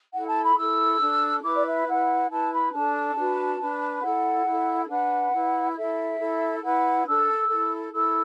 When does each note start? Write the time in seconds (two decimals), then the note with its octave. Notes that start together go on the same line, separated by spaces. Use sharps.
0.13 E4 A4 F#5
0.28 A5
0.42 B5
0.56 E4 A4 E6
1.00 D4 A4
1.43 E4 B4 D6
1.54 D5
1.64 E5
1.87 E4 B4 F#5
2.30 E4 B4 A5
2.51 B5
2.72 D4 A4 A5
3.16 D4 F#4 B4
3.60 D4 B4
4.02 E4 A4 F#5
4.46 E4 A4
4.89 D4 B4 F#5
5.33 E4 B4
5.76 E4 A4 E5
6.19 E4 A4
6.62 E4 B4 F#5
7.06 D4 A4 E6
7.49 E4 A4
7.92 E4 A4 E6